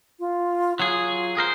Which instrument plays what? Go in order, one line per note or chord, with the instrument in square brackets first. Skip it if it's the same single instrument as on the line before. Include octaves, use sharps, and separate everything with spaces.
[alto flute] F4
[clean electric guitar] F#3 G#4 [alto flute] F4
[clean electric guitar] G#4 A#4 C5